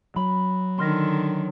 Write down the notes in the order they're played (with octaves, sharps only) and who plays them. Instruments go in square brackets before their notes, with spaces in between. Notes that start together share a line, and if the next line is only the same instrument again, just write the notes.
[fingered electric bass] F#3 [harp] B5
[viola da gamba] D3 D#3 [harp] C6 F6 A#6